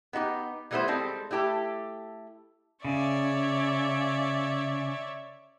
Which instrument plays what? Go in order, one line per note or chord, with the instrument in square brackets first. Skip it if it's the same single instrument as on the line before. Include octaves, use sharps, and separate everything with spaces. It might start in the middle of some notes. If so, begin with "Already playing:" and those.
[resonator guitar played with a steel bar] B3 D#4 F#4 G4
E3 G3 A3 B3 E4 C5
G3 G#3 C4 A4
A3 E4 G4 A4
[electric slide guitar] C#3 [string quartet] C#5 D5 E5